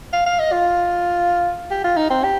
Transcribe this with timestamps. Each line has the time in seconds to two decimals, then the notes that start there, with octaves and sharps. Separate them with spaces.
0.13 F5
0.26 F5
0.39 D#5
0.52 F4
1.71 G4
1.84 F4
1.97 D#4
2.10 C4
2.24 G4